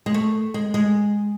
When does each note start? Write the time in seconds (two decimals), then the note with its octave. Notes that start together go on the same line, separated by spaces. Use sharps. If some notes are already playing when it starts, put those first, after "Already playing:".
0.06 G#3
0.14 A3
0.54 G#3
0.74 G#3